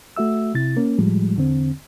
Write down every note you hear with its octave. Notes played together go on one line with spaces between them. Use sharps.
A3 F#4 E5 E6
C3 E4 A6
A#3 C#4
A2 F3 G3 G#3
E2 D3 C4